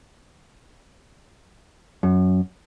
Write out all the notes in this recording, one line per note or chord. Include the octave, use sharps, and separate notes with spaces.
F#2